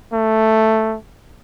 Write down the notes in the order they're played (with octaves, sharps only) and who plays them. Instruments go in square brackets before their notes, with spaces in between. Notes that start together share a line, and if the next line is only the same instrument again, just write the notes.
[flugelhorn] A3